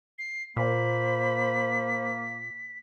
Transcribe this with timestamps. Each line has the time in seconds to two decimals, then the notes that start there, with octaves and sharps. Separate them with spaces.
0.18 C7
0.56 A#2 A#3 C5 B5 B6